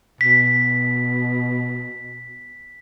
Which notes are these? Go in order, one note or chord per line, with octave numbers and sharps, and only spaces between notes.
B2 B6